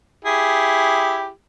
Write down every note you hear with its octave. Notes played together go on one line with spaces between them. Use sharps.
E4 G4 G#4